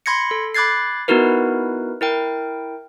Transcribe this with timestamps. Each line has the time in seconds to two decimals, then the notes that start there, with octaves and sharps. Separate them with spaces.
0.06 B5 C6 G#6 A#6 C#7
0.31 A4
0.55 B5 D6 F#6 G#6 A6 C7
1.08 B3 D#4 E4 F#4 A#4 B4
2.01 E4 A#4 G5